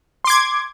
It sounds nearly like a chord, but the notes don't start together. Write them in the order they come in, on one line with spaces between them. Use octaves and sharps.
C6 D6 G#6